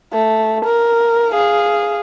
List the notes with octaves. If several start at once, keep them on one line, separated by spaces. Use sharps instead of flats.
A3
A#4
G#4 F5